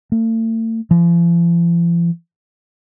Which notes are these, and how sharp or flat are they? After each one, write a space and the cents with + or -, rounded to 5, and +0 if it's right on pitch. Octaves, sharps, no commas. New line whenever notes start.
A3 +40
F3 -45